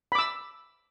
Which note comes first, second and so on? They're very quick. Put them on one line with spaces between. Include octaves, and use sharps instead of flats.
B5 D6 E6